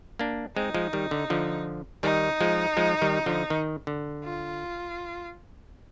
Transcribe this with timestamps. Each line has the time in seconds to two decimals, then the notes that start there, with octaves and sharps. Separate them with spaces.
0.19 A#3 D4
0.57 G#3 C4 D#4
0.75 F3 G#3
0.93 D#3 G3
1.11 D3
1.30 D3 F3
2.03 D#3 G3 D#4
2.41 F3 G#3
2.77 F3 G#3
3.02 D#3 G3
3.26 D3 F3
3.50 D#3
3.87 D3
4.24 F4